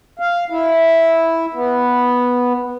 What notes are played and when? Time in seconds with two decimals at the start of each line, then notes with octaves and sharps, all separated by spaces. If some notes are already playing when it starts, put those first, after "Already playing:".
0.19 F5
0.50 E4
1.54 B3